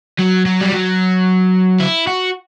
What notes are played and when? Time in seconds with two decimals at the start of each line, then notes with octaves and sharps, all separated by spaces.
0.19 F#3
0.46 F#3
0.61 G3
0.72 F#3
1.80 E4
2.07 F#4